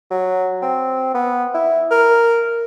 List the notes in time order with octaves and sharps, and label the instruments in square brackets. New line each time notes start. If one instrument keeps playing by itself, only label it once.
[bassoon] F#3
C4
B3
E4
A#4